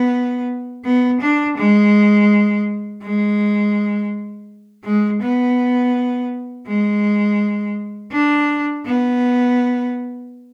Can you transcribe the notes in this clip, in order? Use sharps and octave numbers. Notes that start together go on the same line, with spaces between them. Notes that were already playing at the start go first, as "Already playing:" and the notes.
Already playing: B3
B3
D4
G#3
G#3
G#3
B3
G#3
D4
B3